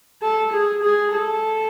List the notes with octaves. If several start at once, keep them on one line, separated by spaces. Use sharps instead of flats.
A4
G#4
G#4
A4